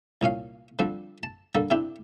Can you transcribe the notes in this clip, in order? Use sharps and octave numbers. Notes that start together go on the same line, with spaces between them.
C2 A#2 C#4 F5
D3 F3 G3 C4 D4
A5
D3 G3 A#3 A4
C3 C4 D4 E4 G4